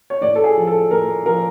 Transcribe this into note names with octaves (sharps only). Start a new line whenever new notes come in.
C#5
A2 D5
A4
G#4
F3
A4
A2 A#4
F3 A#4